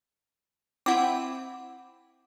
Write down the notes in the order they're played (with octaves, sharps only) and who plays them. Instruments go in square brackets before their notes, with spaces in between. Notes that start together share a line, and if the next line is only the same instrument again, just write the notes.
[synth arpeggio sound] C4 E4 [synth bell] F#5 D6